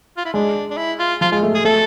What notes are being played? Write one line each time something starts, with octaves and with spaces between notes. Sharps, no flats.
F4
E4
G#3 D4
D4
E4
F4
F3 F4
G#3 F4
A3
G#4
A3 A4